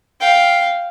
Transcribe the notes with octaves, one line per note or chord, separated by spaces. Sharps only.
F5 G5